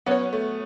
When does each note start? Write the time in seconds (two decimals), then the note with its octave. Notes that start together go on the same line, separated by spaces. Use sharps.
0.06 F#3 B3 C#4 F#4 C#5
0.33 A3